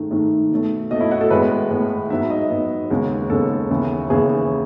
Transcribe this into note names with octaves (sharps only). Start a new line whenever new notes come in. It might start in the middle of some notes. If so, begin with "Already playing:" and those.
Already playing: G#2 D#3 A3
G#2 D#3 A3
B2 A3
B2 A3 D#5
E4
F#4
A4
A2 G#3 B3 B4
A2 G#3 B3
G#2 F#3 B3 E5
D#5
G#2 F#3 B3
D#2 C#3 G#3 B3
D#2 C#3 G#3 B3 A4
D#2 C#3 E3 B3
D#2 C#3 E3 B3 G#4